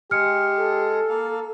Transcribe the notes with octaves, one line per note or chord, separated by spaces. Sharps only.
G#3 G4 G#4 F6 C#7
A4
A#3 F5